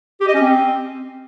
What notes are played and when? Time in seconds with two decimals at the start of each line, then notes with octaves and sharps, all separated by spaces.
0.20 G4
0.27 D#5
0.34 C#4
0.41 C4